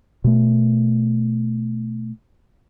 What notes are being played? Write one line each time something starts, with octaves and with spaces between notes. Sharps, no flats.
B2 A3